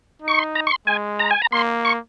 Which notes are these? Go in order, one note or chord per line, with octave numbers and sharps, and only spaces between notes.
D#4
C#6
C6
A#5
C#6
C6
G#3 G#5
A#5
G#5
A#5
A#3 C6
C#6